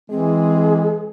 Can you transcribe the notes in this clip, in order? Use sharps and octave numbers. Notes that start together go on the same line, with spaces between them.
E3 G#3 C4 G#4